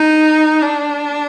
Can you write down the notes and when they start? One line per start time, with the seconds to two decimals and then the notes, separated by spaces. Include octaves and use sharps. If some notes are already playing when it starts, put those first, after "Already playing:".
Already playing: D#4
0.62 D4